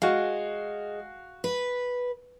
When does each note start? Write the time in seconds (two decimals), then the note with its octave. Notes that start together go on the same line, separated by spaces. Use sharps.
0.02 G#3 F#4 F5
1.44 B4